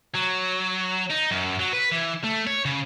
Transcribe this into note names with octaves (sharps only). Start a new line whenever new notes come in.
F#3
D#4
F#2
F#3
B4
E3
A3
C#5
C#3